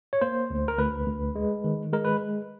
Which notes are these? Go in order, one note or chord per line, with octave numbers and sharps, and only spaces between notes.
C#5
A#3 C5
D2
A#4
D2 B4
D2
G#3
D#3
G#3 A#4
B4